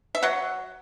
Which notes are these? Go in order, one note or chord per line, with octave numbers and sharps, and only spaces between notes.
E5
F#3 F#5